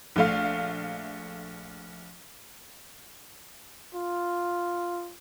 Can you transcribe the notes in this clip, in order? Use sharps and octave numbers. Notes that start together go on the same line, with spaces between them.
A#1 A3 F5
F4